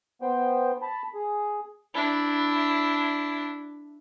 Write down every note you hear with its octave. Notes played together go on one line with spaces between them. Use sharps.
B3 C5 G5
A5 B5
G#4
D4 E4